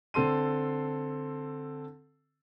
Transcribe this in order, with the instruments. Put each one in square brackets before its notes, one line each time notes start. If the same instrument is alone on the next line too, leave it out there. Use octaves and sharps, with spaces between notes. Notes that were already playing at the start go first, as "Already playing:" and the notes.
[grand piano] D3 C4 A4 C6 D#7